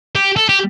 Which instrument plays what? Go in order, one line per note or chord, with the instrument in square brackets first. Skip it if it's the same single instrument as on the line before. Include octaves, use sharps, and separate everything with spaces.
[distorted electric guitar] G4
A4
G4